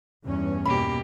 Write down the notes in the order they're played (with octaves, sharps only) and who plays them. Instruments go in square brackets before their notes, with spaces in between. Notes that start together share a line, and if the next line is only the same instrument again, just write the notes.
[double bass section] E2 G2 C#4
[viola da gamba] B2 A#3 G4 [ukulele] B5